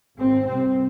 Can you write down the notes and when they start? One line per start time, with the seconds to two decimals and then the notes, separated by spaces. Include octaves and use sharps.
0.20 G#1 G#2 C4
0.47 C2 C3 C4